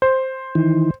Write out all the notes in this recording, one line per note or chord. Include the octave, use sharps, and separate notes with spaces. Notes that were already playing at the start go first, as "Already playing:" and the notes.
C5
D#3 E3